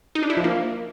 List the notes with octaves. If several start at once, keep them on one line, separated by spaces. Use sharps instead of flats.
D#4
D4
E4
F3
A#3